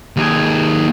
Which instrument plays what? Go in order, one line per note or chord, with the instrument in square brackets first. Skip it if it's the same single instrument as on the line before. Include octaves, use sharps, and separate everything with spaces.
[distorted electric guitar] D#2 G#4